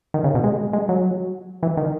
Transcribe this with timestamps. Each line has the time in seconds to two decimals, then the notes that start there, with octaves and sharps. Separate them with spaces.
0.14 D#3
0.24 C#3
0.35 B2
0.44 G#3
0.73 G#3
0.89 F#3
1.63 E3
1.77 D#3